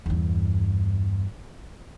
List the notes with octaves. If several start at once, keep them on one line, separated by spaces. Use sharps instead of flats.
E2 G2